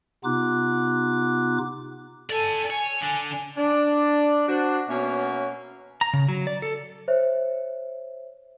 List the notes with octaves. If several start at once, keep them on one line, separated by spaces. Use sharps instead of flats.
C3 B3 D#4 F4 D6 F#6
A4 D5 G#5
C#5 G#5
D3
D4 D5
D4 F#4 C5
B2 A#3 B3 C#4 C#5 E5
A#5
C#3
F#3
D5
A4
C5 C#5 E5